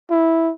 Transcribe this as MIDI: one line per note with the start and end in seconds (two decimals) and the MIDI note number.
0.11 0.52 64